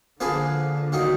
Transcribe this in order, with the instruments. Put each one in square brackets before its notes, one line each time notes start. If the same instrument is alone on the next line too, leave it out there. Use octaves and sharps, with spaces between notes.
[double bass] D3 [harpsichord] F3 A#3 D4 G#4 B4
[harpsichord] D#3 F#3 A#3 D#4